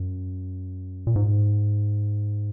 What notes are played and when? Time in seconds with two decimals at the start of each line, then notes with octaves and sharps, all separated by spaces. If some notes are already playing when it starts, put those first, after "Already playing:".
Already playing: F#2
1.07 A#2
1.16 G#2